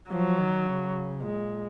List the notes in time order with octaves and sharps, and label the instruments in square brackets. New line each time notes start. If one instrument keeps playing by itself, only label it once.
[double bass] F3 [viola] F#3
[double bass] D#3
C#3
[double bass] A#2 [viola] G#3